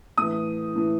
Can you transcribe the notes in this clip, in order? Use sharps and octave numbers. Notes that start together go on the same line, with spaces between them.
A2 E3 D#6
A2 E3